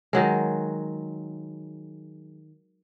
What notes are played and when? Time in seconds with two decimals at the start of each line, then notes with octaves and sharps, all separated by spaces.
0.13 D#3 F#3 G#3